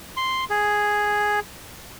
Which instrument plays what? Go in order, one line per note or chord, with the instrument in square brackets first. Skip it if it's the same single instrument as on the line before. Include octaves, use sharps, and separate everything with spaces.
[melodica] C6
G#4